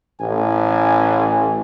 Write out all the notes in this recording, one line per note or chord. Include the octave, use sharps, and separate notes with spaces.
A1 G#5